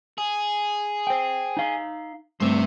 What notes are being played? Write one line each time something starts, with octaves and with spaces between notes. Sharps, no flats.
G#4
C5 G5
D#4 F5
G2 A3 C4 C5 E5